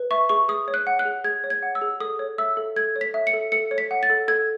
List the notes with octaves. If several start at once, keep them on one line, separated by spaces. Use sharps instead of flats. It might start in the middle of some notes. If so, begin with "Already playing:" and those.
Already playing: B4
E5 C#6
G#4 C#6
G#4 D#6
C#5
F#6
F#5
F#6
G#4
G#4 G#6
C#5
G#6
F#5
E6
G#4
A4 D#6
C#5
E5 E6
A4
A4 G#6
C#5
B6
E5
C#7
A4
A4 C#7
C#5
B6
F#5
A6
A4
A4 G#6